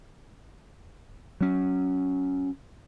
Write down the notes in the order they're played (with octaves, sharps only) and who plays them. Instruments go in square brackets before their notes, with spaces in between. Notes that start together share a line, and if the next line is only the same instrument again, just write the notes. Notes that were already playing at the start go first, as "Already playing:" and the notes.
[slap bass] F#3 C#4